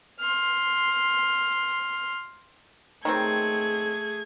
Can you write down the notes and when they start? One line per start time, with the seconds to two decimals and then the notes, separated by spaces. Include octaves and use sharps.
0.20 C6 F6
3.05 D#3 F#3 A3 C4 G#4 G#6